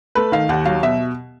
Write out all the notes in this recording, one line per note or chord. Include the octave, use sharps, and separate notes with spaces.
A3 B4
D#3 F5
D#2 F#5
F#3 F5
B2 E5